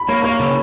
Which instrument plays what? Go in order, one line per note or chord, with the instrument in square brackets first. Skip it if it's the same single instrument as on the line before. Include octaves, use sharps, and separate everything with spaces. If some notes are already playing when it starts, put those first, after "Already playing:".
Already playing: [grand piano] B5
[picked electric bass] A#3 [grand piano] C#5
[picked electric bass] A#3 [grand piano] C#5
[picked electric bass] C#3